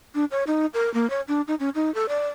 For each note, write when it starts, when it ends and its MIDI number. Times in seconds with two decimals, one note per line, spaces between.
0.15 0.25 62
0.31 0.44 73
0.47 0.66 63
0.74 0.92 70
0.94 1.09 58
1.10 1.21 73
1.28 1.41 62
1.47 1.55 63
1.60 1.69 61
1.75 1.93 63
1.94 2.06 69
2.08 2.27 74